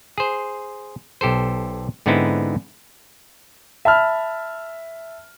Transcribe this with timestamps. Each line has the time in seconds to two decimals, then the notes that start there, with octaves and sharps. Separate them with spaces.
0.18 G#4 C5
1.21 B1 G4 A4 C5
2.06 G#2 D3 B3 C4 D#4 E4
3.85 E5 A5 B5 F6